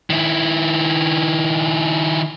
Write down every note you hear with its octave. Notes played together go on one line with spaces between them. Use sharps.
D#3 E4